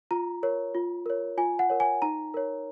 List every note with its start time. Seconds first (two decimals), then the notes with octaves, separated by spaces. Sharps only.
0.11 F4 A#5
0.43 A#4 C#5
0.75 F4
1.06 A#4 C#5
1.37 F4 G#5
1.59 F#5
1.70 A#4 C#5
1.80 G#5
2.02 D#4 A#5
2.34 A#4 C#5